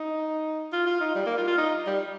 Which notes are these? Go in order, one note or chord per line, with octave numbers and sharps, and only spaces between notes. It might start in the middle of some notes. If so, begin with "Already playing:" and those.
Already playing: D#4
F4
F4
D#4
G3
A#3
F4
F4
D#4
G3